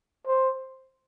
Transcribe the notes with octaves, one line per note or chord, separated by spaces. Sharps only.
C5